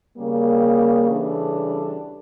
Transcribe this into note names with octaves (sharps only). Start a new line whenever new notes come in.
C#3 G3 A#3
C#3 E3 G3 D4 A4